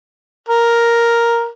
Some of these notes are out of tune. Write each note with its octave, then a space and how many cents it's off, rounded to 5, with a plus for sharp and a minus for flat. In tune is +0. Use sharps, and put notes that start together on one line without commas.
A#4 +5